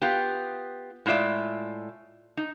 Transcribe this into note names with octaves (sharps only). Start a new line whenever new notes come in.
B3 F4 G4
A2 G#3 F4 D5 E5
D#4